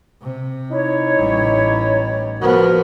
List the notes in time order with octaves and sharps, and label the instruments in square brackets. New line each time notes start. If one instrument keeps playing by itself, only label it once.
[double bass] C3
[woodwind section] D#4 E4 C#5
[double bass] A1 G3
[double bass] F3 B3 [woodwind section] F#4 A#4